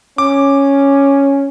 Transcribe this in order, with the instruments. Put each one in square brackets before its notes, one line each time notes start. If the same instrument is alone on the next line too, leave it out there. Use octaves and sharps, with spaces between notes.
[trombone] C#4 [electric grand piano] D6